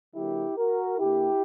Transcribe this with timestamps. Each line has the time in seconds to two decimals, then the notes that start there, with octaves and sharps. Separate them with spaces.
0.14 D3 F#3 A#3 E4 G4
0.56 F#4 A#4
0.98 D3 A#3 E4 G4